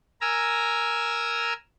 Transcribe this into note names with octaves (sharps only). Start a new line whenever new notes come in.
A#4 G#5 A#5 E6